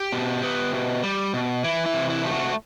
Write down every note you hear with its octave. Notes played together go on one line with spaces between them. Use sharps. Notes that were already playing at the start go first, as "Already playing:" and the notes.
Already playing: G4
B2
B3
B2
G3
B2
E3 E4
E4
C3
E4
A3 G4
F#4